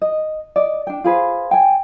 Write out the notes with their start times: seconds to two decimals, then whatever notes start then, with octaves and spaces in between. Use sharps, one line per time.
0.02 D#5
0.56 D5 D#5
0.87 D4 G5
1.04 F4 G#4 B4 C5
1.51 G5 G#5